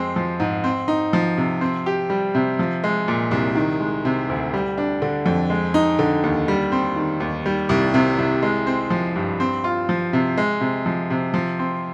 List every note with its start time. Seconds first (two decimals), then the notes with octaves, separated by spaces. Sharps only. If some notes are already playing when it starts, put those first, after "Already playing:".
Already playing: F2 G#3 C4
0.16 F3
0.40 G#2
0.64 C4
0.88 D#4
1.13 F3
1.38 C3
1.61 C4
1.86 G4
2.10 G3
2.35 C3
2.59 F3
2.84 G#3
3.08 A#2
3.31 C2
3.55 D#3
3.80 G#3
4.05 C3
4.29 D2
4.54 G3
4.78 D4
5.02 D3
5.26 F2
5.50 G#3
5.74 D#4
5.99 D3
6.24 D#2
6.48 G3
6.72 C4
6.96 D#3
7.20 D#2
7.46 G3
7.69 C2
7.94 C3
8.18 C2
8.43 G#3
8.67 C4
8.90 F3
9.16 G2
9.40 C4
9.64 F4
9.89 F3
10.13 C3
10.37 G#3
10.61 C3
10.86 F3
11.10 C3
11.34 F3
11.59 C4